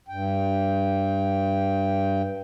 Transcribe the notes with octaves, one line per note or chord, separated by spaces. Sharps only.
G2 G5